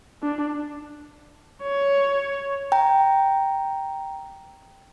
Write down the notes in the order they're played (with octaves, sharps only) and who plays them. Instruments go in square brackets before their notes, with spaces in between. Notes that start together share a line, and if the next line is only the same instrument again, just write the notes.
[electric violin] D4
[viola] C#5
[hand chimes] G5 A#5